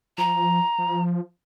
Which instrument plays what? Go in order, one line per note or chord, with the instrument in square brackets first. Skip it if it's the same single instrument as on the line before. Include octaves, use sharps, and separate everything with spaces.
[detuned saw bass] F3 [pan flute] A#5
[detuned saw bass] F3